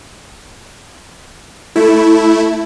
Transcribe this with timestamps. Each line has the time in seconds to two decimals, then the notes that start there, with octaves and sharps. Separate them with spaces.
1.76 A3 E4